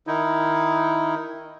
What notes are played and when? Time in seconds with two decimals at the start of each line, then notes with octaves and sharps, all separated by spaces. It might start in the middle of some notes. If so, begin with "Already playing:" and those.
0.07 D#3 D#4 E4